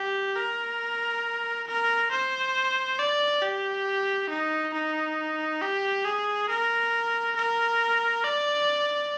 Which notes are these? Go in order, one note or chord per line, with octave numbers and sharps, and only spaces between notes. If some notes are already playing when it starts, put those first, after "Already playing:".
Already playing: G4
A#4
A#4
C5
D5
G4
D#4
D#4
G4
G#4
A#4
A#4
D5